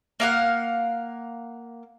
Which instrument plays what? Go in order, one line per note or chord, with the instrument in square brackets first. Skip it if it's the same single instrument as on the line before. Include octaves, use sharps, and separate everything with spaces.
[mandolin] A#3 F5 F#5